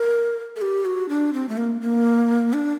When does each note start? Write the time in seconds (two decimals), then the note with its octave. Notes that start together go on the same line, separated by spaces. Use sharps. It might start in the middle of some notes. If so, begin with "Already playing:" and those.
Already playing: A#4
0.56 A4
0.61 G4
0.85 F#4
1.09 D4
1.33 C4
1.49 A3
1.57 A#3
1.81 A#3
2.53 D4